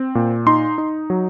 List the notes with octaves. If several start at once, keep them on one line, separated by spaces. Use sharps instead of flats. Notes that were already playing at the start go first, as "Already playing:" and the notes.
Already playing: C4
A#2
D#4 C6
D#4
F#3